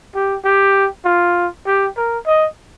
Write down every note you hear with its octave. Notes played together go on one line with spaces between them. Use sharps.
G4
G4
F4
G4
A#4
D#5